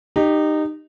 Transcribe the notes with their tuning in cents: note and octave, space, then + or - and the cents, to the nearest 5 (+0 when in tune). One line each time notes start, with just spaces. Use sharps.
D#4 -20 G4 +0